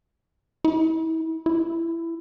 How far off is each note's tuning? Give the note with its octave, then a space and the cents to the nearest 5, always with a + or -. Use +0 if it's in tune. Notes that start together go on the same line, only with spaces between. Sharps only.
E4 -35
E4 +15